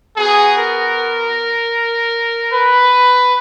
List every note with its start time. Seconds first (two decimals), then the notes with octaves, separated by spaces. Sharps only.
0.17 B3 F#4 G#4
0.57 A#4
2.53 B4